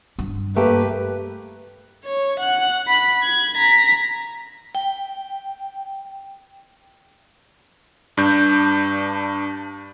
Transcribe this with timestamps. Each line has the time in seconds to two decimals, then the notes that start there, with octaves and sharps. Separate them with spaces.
0.19 G2
0.57 A3 A#3 G4 B4
2.05 C#5
2.40 F#5 F#6
2.88 B5
3.23 G#6
3.57 A#5 B6
4.75 G5
8.17 G2 D4 G6